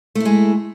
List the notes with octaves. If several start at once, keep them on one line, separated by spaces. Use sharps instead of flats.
G#3 A3 E4